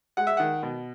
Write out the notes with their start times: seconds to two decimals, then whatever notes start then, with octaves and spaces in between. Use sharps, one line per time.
0.17 G#3 F#5
0.27 E5
0.37 D#3 F#5
0.63 B2